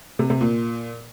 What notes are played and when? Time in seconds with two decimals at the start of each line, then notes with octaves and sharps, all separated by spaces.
0.19 C3
0.30 C3
0.41 A#2